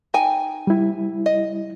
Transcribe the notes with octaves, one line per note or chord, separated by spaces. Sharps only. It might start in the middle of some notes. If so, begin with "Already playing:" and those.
D#4 G5 G#5
G3 E4
D#5